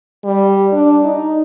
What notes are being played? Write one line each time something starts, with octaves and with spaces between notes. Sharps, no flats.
G3
D4
D#4